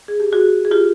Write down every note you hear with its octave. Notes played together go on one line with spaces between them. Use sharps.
G#4
G4
F#4 G#4
G#4
F4 G4